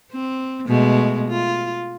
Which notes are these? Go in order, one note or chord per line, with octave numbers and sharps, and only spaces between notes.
C4
B2 G#3 A3
F4